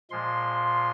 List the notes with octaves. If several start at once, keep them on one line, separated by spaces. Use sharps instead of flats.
A#2 F3 G#3 C6